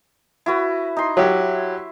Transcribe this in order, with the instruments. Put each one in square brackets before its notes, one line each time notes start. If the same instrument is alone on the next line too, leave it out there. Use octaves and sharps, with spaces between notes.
[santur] E4 F#4 B4
D#4 C6
[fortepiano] F#3 G4 [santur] E4